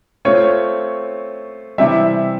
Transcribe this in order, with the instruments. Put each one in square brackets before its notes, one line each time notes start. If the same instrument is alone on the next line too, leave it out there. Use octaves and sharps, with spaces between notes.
[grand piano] A3 C4 F4 [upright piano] C#5
[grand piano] C3 E3 G3 [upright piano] E5